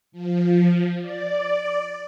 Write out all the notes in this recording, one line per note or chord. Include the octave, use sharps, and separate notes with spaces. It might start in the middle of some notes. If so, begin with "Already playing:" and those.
F3
D5